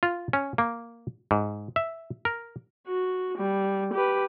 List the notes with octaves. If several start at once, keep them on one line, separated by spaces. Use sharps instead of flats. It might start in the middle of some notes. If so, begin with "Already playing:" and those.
F4
C#4
A#3
G#2
E5
A#4
F#4
G3
G4 B4